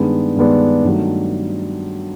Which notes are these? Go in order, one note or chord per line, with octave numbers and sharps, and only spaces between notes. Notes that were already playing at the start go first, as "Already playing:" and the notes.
Already playing: G2 D#3 G#3 B3 D4
G2 D#3 G#3 B3 D4
G2 D#3 F#3 A3